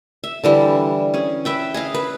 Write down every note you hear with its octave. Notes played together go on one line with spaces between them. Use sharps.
E5
D3 E3 G3
C#4 G#4
B4 E5 G5
G#4 D#5 F5
B4